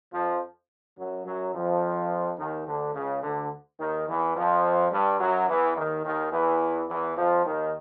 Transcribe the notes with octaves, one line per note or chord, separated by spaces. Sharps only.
F2 F3
F#2 F#3
F#2 F#3
F2 F3
D#2 D#3
D2 D3
C#2 C#3
D2 D3
D#2 D#3
E2 E3
F2 F3
G2 G3
F#2 F#3
E2 E3
D#2 D#3
D#2 D#3
E2 E3
E2 E3
F2 F3
D#2 D#3